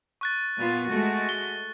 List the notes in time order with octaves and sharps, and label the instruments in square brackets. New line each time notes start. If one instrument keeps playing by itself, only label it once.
[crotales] C#6 F#6 A6
[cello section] A#2 B3 F4
G#3 A3 F#4
[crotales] G7